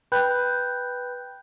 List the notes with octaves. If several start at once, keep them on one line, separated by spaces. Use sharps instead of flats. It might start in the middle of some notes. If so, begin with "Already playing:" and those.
B4 G5 B5 F#6 G6